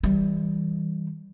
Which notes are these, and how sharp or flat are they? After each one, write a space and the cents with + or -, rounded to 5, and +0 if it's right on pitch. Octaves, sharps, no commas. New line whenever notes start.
E3 -30 G3 -10